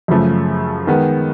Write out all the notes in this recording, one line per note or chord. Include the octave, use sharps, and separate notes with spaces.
F#2 C#3 F3 A3
D#3 G#3 B3